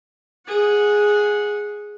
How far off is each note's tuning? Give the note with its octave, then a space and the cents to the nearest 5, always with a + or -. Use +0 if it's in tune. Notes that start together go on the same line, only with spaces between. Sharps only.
G#4 +0 F#5 -15